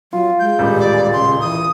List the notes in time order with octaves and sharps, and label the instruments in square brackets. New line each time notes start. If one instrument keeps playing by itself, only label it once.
[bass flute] F#3 [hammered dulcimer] F4
[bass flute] G#3 [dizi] G6
[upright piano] D#1 A1 G3
[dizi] D5
[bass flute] C#3 [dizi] C6
[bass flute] E3 [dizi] D#6